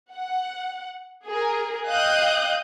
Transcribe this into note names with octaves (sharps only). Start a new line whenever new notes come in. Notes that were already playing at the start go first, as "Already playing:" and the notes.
F#5
G#4 A#4
D#5 F5 G5 D#6 F#6 G6